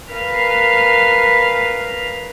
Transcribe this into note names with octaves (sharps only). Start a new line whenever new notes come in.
A#4 B4 F5 G#5 F6